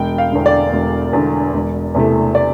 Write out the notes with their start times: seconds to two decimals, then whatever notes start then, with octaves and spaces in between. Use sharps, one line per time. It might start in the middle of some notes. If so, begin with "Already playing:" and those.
Already playing: E1 G5
0.18 F5
0.32 E2 D3
0.46 D5
0.73 E1
1.13 E2 D3
1.53 E1
1.94 E2 C3 E3 A3
2.35 D5